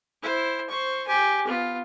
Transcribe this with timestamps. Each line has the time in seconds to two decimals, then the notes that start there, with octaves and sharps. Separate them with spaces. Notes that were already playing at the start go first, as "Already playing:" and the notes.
0.22 E4 C5
0.69 C5 C#6
1.07 G4 G#5
1.47 B3 F4